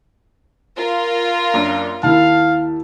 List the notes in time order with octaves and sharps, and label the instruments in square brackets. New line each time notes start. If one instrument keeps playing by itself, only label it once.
[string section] F4 A#4
[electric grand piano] F#2 A#3 D4
[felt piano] D#2 E4 [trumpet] F5 [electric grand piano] A5